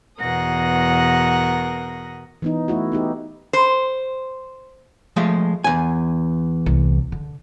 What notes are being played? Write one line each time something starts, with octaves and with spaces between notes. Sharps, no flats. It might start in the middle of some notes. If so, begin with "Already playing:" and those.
E2 B2 A#4 F#5 D#6 A#6
E3 B3 D#4
A3 E4 F#4
B3 D#4 G4
C5
F3 G#3 A3
E2 G#5
C2
D3